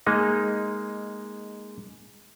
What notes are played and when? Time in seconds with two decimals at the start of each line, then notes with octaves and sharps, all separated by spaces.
0.07 G#3 A#3 D#4